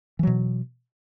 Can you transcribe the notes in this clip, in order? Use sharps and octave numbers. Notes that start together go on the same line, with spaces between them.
B2 E3 F#3